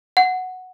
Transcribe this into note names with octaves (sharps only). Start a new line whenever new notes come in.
F#5